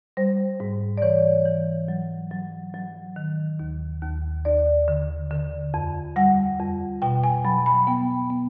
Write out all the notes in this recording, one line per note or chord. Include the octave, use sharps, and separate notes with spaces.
G3 C5
G#2
D5
E3 C#5
E3
F#3
F#3
F#3
D#3
D#2
D#2
D#2 D5
D3
D3
F2
G3 F#5
F2
B2 G5
G#5
F#3 B5
B5
B3 G5
B3